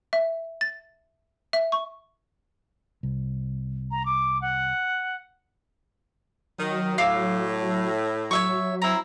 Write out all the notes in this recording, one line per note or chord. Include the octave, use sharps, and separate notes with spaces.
E5
A6
E5
C#6
C2
A#5
D6
F#5
D#3 F#3
A2 F5 D6 E6
F#3 C#5 E5 C#6
C4 E4 A#5